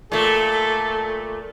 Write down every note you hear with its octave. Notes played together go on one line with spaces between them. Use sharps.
A#2 A3 A4